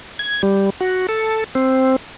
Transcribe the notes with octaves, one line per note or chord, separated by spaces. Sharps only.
G#6
G3
F#4
A4
C4